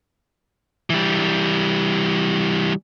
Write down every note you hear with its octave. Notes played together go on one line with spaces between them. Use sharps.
E3 G3